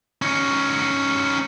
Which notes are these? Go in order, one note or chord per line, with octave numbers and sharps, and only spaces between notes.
C#4 D#4